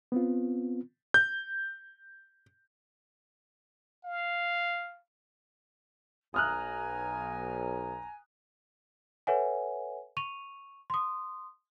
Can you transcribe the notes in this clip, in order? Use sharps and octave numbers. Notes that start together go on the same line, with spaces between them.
B3 C4 F4
G6
F5
B1 G#5 A#5 D#6 F6 F#6
A4 B4 C#5 E5 F#5 G#5
C#6 D#7 F7
C6 D#6